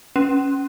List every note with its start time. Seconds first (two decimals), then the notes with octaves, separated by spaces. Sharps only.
0.16 C#4